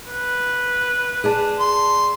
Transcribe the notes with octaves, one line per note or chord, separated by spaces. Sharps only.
B4
G#4 D5 A5
C6